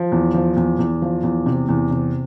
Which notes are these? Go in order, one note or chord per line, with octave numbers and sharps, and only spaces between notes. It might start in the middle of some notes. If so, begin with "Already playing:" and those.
Already playing: F3
E2
F3
E2
E2
F3
E2
C3
E2
C3